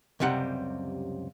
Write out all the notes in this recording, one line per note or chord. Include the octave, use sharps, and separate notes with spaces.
C#2 F#2 C3 G3 F#5